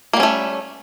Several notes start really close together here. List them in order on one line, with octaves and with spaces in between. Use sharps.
A#3 G3 C#4 A3